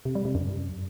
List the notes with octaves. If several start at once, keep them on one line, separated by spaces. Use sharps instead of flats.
C3
G3
C3
F#2